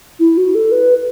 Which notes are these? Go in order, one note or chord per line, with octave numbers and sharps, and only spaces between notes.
E4
F#4
A4
B4